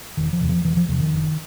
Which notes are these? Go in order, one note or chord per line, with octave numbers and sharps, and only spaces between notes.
E1 D#3
F3
E2 C3
F3
E1 E3
F3
E2 C3 F3
D#3
F#1